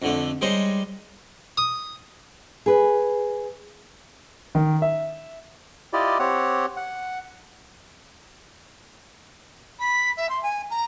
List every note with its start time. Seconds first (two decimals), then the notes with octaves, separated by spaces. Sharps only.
0.02 F2 D3 A3
0.41 G3 G#3 D#4 C5 C#5 D#5
1.58 D#6
2.66 G#4 B4
4.55 D#3
4.82 E5
5.93 E4 F4 G4 D5 D#5
6.19 C4 G4 C#5 F#5
6.77 F#5
9.79 B5
10.17 E5
10.29 C6
10.42 G#5
10.70 A#5